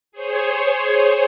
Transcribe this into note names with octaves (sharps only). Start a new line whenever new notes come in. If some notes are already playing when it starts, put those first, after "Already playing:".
G#4 C5 C#5